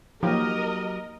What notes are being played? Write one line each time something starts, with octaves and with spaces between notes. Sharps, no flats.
F3 F#3 A#3 D#4 G4 A#4 D#5